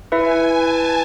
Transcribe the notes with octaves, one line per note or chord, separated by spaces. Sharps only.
E4 B4 E5 G#5
A5